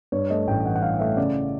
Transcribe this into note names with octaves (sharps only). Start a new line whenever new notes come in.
G2 C#5
A3 D#5
A1 G5
E3 F#5
F#5
G2 F5
A3 E5
C#3 D5